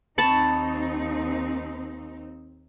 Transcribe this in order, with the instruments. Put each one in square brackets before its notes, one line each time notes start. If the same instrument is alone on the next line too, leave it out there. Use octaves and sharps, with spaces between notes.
[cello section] D#2 C4 D#4 [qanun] A5 B5 C#6